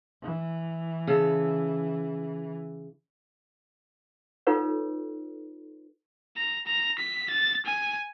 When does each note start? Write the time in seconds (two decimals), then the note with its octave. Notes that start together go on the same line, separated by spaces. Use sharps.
0.22 E3
1.07 C#3 A4
4.47 D#4 F4 A4 B4 C#5
6.37 A#5
6.66 A#5
6.98 B6
7.30 A6
7.65 G#5